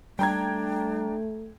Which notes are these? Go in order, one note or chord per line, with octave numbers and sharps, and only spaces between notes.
G3 A3 D4 G5 A#5 G#6